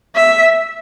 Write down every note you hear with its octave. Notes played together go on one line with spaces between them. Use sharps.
E5